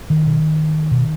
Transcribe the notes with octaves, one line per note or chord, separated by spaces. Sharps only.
D#3
B2
B2